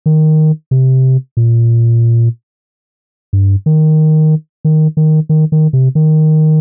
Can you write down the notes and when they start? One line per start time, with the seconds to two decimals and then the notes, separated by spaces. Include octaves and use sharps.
0.06 D#3
0.71 C3
1.37 A#2
3.33 G2
3.66 D#3
4.65 D#3
4.97 D#3
5.29 D#3
5.52 D#3
5.73 C3
5.95 D#3